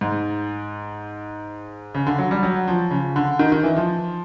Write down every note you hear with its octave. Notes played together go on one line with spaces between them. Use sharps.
G#2
C#3
D3
F#3
G3
F#3
F3
C#3
D3
D#3
D#3
E3
F3